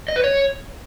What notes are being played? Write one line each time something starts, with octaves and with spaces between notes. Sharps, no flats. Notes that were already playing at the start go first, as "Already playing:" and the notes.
D#5
B4
C#5